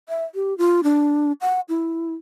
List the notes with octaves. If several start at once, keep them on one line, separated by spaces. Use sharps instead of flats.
E5
G4
F4
D4
F#5
E4